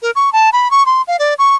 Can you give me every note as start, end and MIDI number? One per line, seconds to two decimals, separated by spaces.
0.02 0.11 70
0.16 0.32 85
0.33 0.49 81
0.53 0.71 83
0.71 0.83 85
0.86 1.02 84
1.08 1.17 77
1.19 1.34 74
1.38 1.55 85